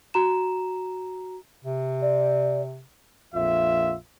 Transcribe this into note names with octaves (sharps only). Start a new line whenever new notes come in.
F#4 A#5 E7
C3
D5
A#1 F2 F4 E5